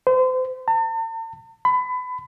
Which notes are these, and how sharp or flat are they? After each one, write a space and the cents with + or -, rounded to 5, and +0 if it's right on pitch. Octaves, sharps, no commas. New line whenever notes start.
C5 -35
A5 +45
B5 +25